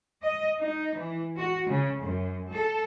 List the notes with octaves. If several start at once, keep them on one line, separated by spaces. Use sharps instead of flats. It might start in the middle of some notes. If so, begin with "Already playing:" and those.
D#5
D#4
E3
F#4
C#3
F#2
A4